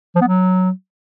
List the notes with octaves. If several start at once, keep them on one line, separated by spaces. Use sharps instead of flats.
F3
B3
F#3